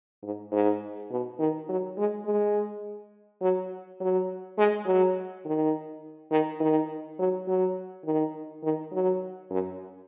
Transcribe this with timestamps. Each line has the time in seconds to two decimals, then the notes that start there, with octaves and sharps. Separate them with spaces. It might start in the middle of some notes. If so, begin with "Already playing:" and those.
0.24 G#2
0.52 G#2
1.11 B2
1.40 D#3
1.69 F#3
1.98 G#3
2.26 G#3
3.42 F#3
4.01 F#3
4.58 G#3
4.86 F#3
5.45 D#3
6.31 D#3
6.60 D#3
7.19 F#3
7.48 F#3
8.05 D#3
8.63 D#3
8.92 F#3
9.51 F#2